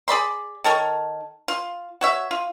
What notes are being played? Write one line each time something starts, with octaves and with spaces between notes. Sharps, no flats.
G#4 D5 B5 C6
D#3 A4 A#4 C#5
F4
F#4 C#5 E5
F4